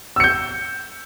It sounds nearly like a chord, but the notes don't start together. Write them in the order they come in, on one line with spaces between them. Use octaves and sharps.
E6 C#7 G6